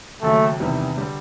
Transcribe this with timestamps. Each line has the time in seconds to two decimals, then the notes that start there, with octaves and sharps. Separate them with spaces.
0.22 D#2 C#3 F#3 A3
0.60 E2 C3 D#3 G3
0.97 D3 G3